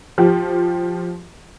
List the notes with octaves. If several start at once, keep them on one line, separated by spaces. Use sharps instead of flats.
F3 G4